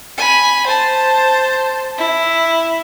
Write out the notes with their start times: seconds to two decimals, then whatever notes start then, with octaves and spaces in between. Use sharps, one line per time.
0.17 G#5 B5
0.66 C5 A5
1.98 E4